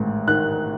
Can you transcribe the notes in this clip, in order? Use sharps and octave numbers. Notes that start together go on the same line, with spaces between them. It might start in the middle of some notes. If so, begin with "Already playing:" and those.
Already playing: A1 G#2 D#3
D#3 F#6